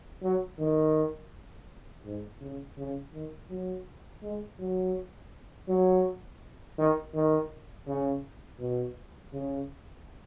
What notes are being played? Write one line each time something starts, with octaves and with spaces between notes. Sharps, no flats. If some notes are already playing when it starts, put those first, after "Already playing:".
F#3
D#3
G#2
C#3
C#3
D#3
F#3
G#3
F#3
F#3
D#3
D#3
C#3
B2
C#3